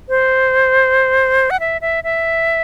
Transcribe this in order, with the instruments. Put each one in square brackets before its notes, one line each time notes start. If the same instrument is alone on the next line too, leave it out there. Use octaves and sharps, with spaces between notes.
[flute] C5
F#5
E5
E5
E5